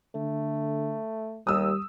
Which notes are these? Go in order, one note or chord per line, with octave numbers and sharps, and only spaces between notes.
D3 A3
D#2 G3 D#6 E6